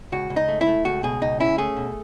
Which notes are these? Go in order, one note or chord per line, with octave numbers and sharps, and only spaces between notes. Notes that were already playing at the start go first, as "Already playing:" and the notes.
C#2 F#4
C#2
D#4
A3
E4
A3
C#2 F#4
B2 G#4
C#2 D#4
C#4 E4
A3 G#4
B2